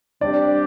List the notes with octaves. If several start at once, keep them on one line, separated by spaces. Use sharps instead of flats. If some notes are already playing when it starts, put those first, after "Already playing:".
C3 G3 D4 G4 D5